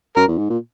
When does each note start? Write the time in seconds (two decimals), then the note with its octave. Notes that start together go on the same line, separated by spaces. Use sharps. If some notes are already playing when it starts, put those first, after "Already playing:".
0.16 F#2 A#4
0.28 E2
0.38 G#2
0.50 A#2